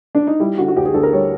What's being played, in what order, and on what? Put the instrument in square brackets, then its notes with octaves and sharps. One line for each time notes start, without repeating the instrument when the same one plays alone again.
[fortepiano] D4
D#4
G3 E4
D3 F#4
F#4
D2 G4
G#4
D2 A4
A#4
G3 C#5